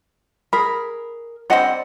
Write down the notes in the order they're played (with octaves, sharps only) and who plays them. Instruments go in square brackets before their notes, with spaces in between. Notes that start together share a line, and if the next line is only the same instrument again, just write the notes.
[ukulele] G#4 A#4 [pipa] B5
[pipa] D3 G3 C4 [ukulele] D5 D#5 F#5